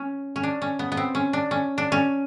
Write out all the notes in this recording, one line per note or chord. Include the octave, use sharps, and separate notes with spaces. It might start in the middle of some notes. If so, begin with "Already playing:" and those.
Already playing: C#4
C#4
D4
C#4
B3
B3
C4
C#4
D4
C#4
D4
C#4